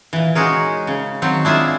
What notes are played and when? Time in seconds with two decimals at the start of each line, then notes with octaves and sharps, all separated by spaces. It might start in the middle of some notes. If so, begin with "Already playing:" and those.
0.13 A#2 E3
0.35 G#3 C#4 D#4 F#4 G#4 A#4
0.87 C#3
1.22 D#3 F#3 C4
1.45 D4 E4 F4 G#4 E5